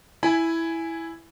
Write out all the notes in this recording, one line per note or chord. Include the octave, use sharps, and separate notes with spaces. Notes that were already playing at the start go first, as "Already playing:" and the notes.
E4 G#5 B5